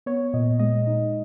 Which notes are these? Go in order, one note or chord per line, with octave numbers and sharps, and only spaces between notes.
B3 C#5
A#2 D#5
G#3 D#5
D#4